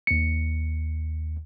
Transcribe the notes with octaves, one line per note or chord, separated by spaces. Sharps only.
D#2 C#7